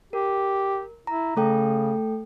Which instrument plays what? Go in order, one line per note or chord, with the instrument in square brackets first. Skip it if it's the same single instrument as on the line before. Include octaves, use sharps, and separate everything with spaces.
[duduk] G4 [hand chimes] A#4
[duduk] E4 [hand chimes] A#5
[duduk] C#3 [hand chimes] A3 A4 G5